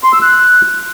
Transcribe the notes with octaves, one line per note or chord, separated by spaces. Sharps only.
C6
E6
F#6